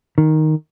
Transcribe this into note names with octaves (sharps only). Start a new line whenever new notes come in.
D#3